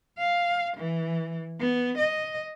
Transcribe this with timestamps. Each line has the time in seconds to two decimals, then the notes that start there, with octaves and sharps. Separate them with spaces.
0.18 F5
0.77 E3
1.60 B3
1.97 D#5